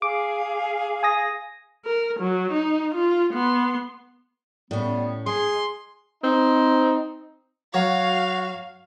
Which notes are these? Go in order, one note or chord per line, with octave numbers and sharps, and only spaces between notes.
G#4 F5 D6
G#5 D#6 A#6
A#4
F#3
D#4
F4
B3 C6
A2 G3 B3 C#4
G#3 G#4 C6
C4 D#4
F#3 F#4 C#5 F5